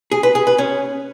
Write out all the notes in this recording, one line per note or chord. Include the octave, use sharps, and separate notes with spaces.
G#4
B4
G#4
B4
C#4